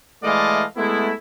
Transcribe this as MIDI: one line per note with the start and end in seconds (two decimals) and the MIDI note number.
0.22 0.64 52
0.22 0.64 56
0.22 0.64 57
0.22 0.64 74
0.22 0.64 75
0.22 0.64 77
0.77 1.12 56
0.77 1.12 57
0.77 1.12 59
0.77 1.12 64